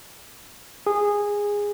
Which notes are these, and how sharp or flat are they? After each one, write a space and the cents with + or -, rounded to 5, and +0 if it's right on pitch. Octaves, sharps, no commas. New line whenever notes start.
G#4 -15